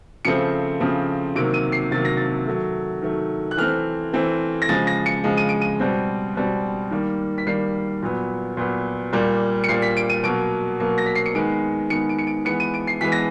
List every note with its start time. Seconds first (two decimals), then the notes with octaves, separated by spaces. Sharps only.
0.25 C#3 F3 A3 C4 C#7
0.80 C#3 F3 A3 C4
1.36 C3 D#3 F#3 A#3 D7
1.54 D#7
1.72 C7
1.91 C3 D#3 F#3 A#3 A6
2.05 A#6
2.17 A6
2.47 D#3 F#3 A3
3.02 D#3 F#3 A3
3.51 F#6
3.57 E3 A3 C4 F6
4.13 E3 A3 C4
4.62 A#6
4.69 C#3 F3 G#3 A6
4.87 A#6
5.06 C#7
5.24 C#3 F3 G#3
5.37 D#7
5.49 D7
5.61 D#7
5.80 B2 G3 C4
6.36 B2 G3 C4
6.91 D#3 G3 A#3
7.38 B6
7.47 D#3 G3 A#3 C7
8.02 A#2 F#3 B3
8.57 A#2 F#3 B3
9.12 A#2 G3 A#3
9.64 C#7
9.68 A#2 G3 A#3 C7
9.82 B6
9.97 D7
10.10 D#7
10.23 B2 F#3 A#3 D7
10.80 B2 F#3 A#3
10.98 A#6
11.06 B6
11.15 C7
11.26 C#7
11.35 D#3 G#3 B3 D7
11.90 D#3 G#3 B3 C#7
12.09 D7
12.19 C#7
12.27 D7
12.45 E3 G#3 B3 C#7
12.60 D#7
12.74 D7
12.87 C7
13.01 E3 G#3 B3 B6
13.12 A#6